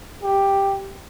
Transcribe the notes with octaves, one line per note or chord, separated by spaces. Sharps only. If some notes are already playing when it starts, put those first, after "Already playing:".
G4